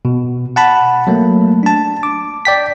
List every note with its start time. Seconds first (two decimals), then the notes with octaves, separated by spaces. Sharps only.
0.05 B2
0.56 F#5 A5 B5
1.07 F#3 A3 A#3
1.63 D4 A5
2.03 D6
2.45 D5 G5 B6